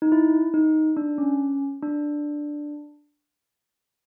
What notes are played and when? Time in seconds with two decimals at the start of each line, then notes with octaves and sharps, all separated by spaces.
0.02 D#4
0.12 E4
0.54 D#4
0.97 D4
1.18 C#4
1.83 D4